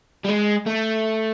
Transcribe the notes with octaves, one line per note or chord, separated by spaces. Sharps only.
G3
G#3
A3